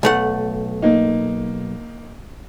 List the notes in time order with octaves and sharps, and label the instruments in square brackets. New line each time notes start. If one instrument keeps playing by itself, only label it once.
[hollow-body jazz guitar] B1 A3 F#5
[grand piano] A#3 D#4